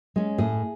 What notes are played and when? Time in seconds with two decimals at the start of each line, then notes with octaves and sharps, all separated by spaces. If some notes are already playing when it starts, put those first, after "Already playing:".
0.16 G#3 C#4
0.38 A2 G#4